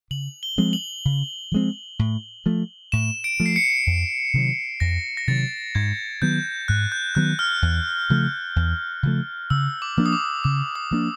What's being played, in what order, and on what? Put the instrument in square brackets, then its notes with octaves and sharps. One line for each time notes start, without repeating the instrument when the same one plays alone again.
[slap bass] C#3 [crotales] F#7
[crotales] G7
[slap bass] F3 G#3 C4
[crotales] F#7
[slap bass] C#3
F3 G#3 C4
A2
F3 A3
[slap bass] A2 [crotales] E7
[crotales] D7
[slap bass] F3 A3
[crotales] C7
C#7
[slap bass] F2
C3 D#3 F#3
[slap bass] F2 [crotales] A#6
[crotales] A#6
[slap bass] C3 D#3 F#3 [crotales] A6
[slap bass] G#2 [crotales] G#6
[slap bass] D#3 F#3 B3 [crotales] G6
[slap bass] G#2 [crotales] F#6
[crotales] G6
[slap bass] D#3 F#3 B3 [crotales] F#6
[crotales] F6
[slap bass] E2
C#3 F3 A3
E2
C#3 F3 A3
[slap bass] C#3 [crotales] E6
[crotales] D6
[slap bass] F3 A#3 D4
[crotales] D#6
D6
[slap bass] C#3 [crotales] D6
[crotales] D#6
[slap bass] F3 A#3 D4